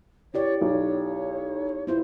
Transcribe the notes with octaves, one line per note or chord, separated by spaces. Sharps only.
E4 G4 C#5 D5
B1 C#5
B3 E4 F4 C5